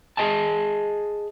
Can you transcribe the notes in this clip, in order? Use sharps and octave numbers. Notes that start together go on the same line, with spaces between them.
G#4 D#5 G#5 A5